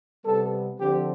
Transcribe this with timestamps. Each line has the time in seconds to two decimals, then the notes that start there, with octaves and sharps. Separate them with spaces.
0.25 C3 G3 B3 A4
0.79 D3 F3 C4 G4